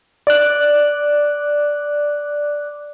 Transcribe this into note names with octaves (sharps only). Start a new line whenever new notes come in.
D5 D6 F#6